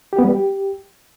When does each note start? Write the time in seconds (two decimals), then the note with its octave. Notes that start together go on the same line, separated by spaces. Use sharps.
0.13 G4
0.19 B3
0.24 G3
0.30 G4